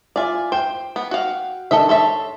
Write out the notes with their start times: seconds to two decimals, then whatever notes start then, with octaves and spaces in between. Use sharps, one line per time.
0.16 F4 D5 E5 G#5
0.52 C5 G5
0.96 B3
1.11 F#4 F5
1.71 D#3 D4 A4 D#5 E5
1.89 A4 C#5 E5 A5 C6